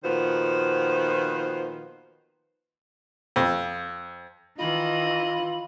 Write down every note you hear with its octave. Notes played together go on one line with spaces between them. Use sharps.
A#2 D#3 F3 B3 F#4 C5
F2
D#3 E3 F4 D#5 B5